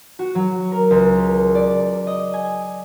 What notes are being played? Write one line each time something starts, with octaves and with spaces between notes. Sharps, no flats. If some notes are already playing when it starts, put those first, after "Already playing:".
F#4
F#3
A#4
C#2
D5
D#5
G#5